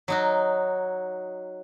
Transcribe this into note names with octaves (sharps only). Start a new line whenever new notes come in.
F#3 D#4 F#4